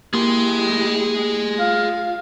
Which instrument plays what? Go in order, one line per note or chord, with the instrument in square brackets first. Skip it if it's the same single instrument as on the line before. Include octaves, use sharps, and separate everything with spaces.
[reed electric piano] A#3 [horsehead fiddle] E4 G4 [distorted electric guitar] G#4 C6
[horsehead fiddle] F4 [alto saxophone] F5